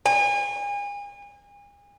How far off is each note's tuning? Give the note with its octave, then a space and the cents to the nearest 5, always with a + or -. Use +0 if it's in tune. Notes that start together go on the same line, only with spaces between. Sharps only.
G#5 -35